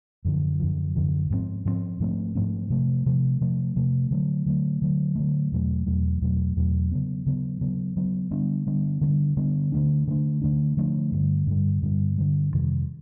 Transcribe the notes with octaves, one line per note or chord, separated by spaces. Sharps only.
F#2 D3 F3
F#2 D3 F3
F#2 D3 F3
G#2 F3 A3 C4
G#2 F3 A3 C4
G#2 F3 A3 C4
G#2 F3 A3 C4
C3 F3 A3
C3 F3 A3
C3 F3 A3
C3 F3 A3
D3 F#3 A3
D3 F#3 A3
D3 F#3 A3
D3 F#3 A3
E2 B2 F#3 A3
E2 B2 F#3 A3
E2 B2 F#3 A3
E2 B2 F#3 A3
C#3 F#3 B3
C#3 F#3 B3
C#3 F#3 B3
C#3 F#3 B3
D3 G3 B3 D4
D3 G3 B3 D4
D3 G3 B3 D4
D3 G3 B3 D4
D3 F3 A3 D4
D3 F3 A3 D4
D3 F3 A3 D4
D3 F3 A3 D4
G2 D3 G3
G2 D3 G3
G2 D3 G3
G2 D3 G3
F2 C3 D#3 G3